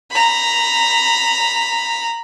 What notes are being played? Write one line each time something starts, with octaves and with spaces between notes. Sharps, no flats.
A#5 B5